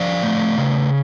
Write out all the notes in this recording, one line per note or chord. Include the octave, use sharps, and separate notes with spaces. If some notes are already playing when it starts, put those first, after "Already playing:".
Already playing: F3 D5 F5
A3
C#3